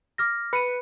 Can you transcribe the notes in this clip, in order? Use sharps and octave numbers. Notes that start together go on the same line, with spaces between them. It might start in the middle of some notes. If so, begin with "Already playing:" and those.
D6 F6 A#6
B4 C#7 D#7